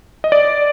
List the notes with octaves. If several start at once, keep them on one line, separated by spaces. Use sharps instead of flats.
D#5
D5